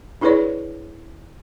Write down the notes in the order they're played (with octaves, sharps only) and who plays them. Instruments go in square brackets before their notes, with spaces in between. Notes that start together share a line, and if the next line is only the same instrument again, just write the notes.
[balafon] D4 E4 G#4 B4 C#5 D5